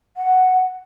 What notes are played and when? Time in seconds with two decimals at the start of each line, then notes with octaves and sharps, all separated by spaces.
0.17 F#5